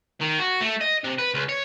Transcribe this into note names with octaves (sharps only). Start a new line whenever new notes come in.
D#3
F#4
A3
D#5
C3
B4
C#2
C#5